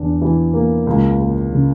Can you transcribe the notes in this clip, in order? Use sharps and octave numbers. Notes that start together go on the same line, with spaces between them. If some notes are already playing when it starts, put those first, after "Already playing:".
Already playing: E2 D4
E3
A#3
C#2
A#3
C#3